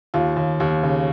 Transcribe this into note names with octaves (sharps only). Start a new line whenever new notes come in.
D#2 F4
D#2
D#2
C#3